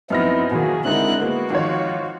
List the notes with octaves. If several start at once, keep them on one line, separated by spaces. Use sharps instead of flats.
F#2 F3 B3 C4 D#4 E4 F6 A#6
B2 D#3 F#3 A#3 G#4
D3 G#3 C4 D#4 E4 A#4 F#6
G#3 A#3 B3 F#4
G#1 D#3 F3 F4 C#5